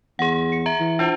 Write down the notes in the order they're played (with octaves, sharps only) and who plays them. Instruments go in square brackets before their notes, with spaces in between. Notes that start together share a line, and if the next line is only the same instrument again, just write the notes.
[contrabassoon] E2 [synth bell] G#4 F#5
[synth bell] C#7
E5 A#5
[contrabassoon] E3
[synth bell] D4 F4 C5